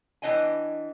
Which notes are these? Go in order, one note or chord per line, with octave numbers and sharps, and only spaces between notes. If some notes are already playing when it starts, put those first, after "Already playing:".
E3 D4 D#5 G5 G#5